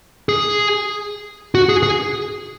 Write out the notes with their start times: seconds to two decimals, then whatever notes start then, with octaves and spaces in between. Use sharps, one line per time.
0.29 G#4
1.55 F#4
1.69 G#4
1.83 G#4